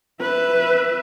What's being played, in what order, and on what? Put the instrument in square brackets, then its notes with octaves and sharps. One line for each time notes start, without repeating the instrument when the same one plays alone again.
[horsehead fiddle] B4 E5